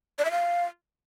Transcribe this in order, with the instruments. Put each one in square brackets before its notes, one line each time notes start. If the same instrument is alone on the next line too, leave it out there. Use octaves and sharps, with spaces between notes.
[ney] D5
E5
F5